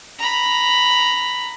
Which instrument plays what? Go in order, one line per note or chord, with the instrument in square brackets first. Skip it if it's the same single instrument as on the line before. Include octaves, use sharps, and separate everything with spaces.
[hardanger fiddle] A#5 B5